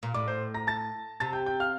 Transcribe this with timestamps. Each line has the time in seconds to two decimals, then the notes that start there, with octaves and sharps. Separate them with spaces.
0.03 A#2
0.14 A2 D5 D6
0.28 C5 C6
0.54 A#5 A#6
0.67 A5 A6
1.20 C3 A5 A6
1.33 G5 G6
1.46 G5 G6
1.60 F5 F6